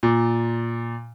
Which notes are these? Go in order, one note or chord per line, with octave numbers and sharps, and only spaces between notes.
A#2